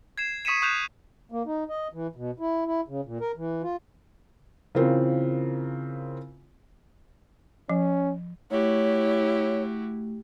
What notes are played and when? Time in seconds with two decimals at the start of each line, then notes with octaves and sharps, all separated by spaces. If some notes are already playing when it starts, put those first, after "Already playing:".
0.18 G#6 C7 E7
0.45 C#6 D#6 B6 C#7 D#7 E7
0.62 C#6 D#6 F#6 G6 E7 F7
1.32 A#3
1.46 D#4
1.69 D#5
1.93 E3
2.15 B2
2.40 E4
2.66 E4
2.88 C#3
3.05 A#2
3.20 A#4
3.37 E3
3.63 F4
4.75 C#3 E3 C4 F4 A#4
7.69 F3 C#4
8.51 A3 E4 F#4 G4 C#5